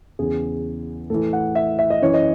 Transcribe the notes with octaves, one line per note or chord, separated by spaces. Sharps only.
E2 C#3 E3 G#4
A2 E3 A4
F#5
E5
E5
D#5
F#2 E3 C#5
D#5